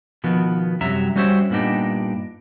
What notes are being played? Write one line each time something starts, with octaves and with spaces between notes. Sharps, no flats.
B2 D#3 F3 B3
F#2 C3 F#3 G3 E5 A#5
G3 C#4 F#4 C5 C#5 E5
G2 A#2 B3 D4 D#4 G4